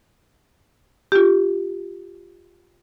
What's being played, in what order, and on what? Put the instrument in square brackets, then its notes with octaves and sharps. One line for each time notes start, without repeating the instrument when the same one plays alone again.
[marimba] F4 G4